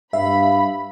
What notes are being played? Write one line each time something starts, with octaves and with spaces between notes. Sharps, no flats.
G2 E5 F5 B5